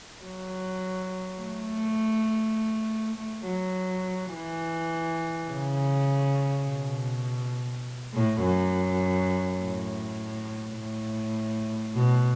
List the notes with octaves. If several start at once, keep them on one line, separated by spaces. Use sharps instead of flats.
F#3
A3
A3
F#3
E3
C#3
B2
A2
F#2
A2
A2
B2